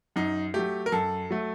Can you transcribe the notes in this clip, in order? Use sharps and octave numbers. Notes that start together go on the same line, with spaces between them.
F#2 D#4
F#3 A3 G4
A#4
F#2 A4
F#3 A3